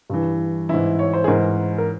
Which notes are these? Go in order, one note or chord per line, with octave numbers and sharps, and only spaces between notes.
G2 E3
G#2 E3 E4
C#5
C5
G#4
G#2 E3 A#4
A#4